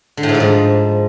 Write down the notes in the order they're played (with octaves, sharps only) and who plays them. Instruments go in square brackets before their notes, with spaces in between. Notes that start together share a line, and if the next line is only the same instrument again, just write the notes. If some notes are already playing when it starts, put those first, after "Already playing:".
[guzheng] D3
A2
G#2
F3
G#2